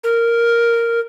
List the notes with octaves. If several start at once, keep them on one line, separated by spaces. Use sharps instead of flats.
A#4